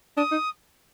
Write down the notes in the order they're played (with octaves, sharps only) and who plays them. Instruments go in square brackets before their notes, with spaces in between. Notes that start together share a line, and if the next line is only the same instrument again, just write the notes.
[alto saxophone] D4 [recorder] D#6
[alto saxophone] D#4